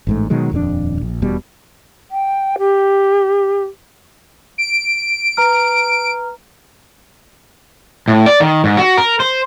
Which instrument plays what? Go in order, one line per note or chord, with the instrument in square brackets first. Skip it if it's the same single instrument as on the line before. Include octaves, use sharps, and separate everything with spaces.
[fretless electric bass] A1 G#2 A3
B2 D#3 F#3 G#3
D#1 F2 F#3 D4
A#1
E1 B2 G3
[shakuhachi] G5
G4
[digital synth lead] D7
[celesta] B4 A#5 F6
[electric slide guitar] A2
D5
D#3
G#2
F#4
A#4
C5